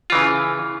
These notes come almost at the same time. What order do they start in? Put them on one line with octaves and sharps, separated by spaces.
F4 E3 C#3